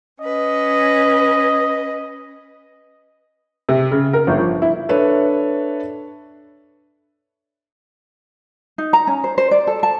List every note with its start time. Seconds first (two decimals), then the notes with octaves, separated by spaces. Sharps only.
0.21 C#4 B4 D#5
3.69 C3
3.91 C#3
4.13 A#4
4.27 G1
4.39 F3
4.62 E4
4.89 D4 A4 B4 C#5 E5
8.78 D#4
8.93 A#5
9.07 C#4
9.24 C5
9.38 C5
9.51 D5
9.67 A4
9.83 A5